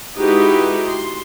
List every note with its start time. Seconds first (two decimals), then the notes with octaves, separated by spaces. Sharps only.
0.17 G#3 D#4 E4 F#4 G4 B4
0.86 C6